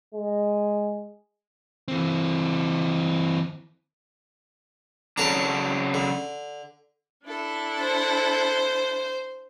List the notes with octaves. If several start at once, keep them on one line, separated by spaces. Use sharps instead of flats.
G#3
E3 C4
C#3 F#3 D4 A4 A5 A#5
D3
D4 E4 A4
C5